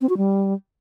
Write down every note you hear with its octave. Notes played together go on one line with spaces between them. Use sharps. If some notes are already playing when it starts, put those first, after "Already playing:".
C4
F#4
G3